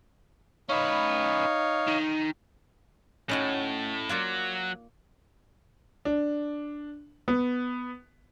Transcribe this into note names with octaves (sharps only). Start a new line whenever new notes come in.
C#4 D#4 B4 C#5 F5
D#3
A2 C#4 D#4 F#4
F#3 A#3 F4 D5
D4
B3